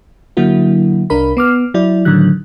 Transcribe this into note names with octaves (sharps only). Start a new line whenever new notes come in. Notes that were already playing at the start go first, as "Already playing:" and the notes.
D3 F#3 A#3 E4 F#4
C2 D4 A#4 B5
B3 D6 F6
F#3 E4 D5
A2 D3 D#3 F#3 F#6